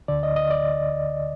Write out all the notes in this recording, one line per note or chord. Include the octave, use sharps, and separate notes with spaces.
D2 D3 D5
D#5
D#5
D5